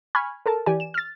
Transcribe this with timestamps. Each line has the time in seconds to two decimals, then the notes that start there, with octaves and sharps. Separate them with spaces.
0.15 G#5 B5 C#6 F6 G#6
0.46 A4 A#4 A5
0.66 E3 G4 D5 G#5
0.80 E7
0.94 F6 A6